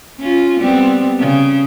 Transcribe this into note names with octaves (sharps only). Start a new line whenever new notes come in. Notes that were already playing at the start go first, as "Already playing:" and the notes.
C#4 F4
G3 B3 C4
C#3